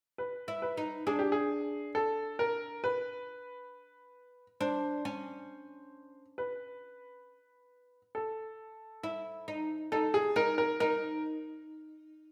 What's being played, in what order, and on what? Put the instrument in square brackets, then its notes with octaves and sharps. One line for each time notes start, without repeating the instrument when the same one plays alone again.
[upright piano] B4
[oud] E4
[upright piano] B4
[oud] D#4
[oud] D4 [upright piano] G#4
[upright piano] G4
G#4
A4
A#4
B4
[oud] D4 [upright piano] C5
[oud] C#4
[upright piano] B4
A4
[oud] E4
D#4
[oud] D#4 [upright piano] A4
[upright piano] G#4
[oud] D#4 [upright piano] A#4
[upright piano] A#4
[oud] D#4 [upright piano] A#4